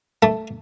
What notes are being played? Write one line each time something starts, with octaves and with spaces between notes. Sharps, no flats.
A3